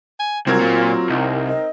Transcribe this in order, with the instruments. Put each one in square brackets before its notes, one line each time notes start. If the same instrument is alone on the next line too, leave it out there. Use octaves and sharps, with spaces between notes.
[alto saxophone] G#5
[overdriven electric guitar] C2 [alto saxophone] F#3 [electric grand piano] C4 A#4 G#6 [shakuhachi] F4
[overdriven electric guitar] A#2
[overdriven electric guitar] C2 [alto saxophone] D#4
[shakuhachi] D#5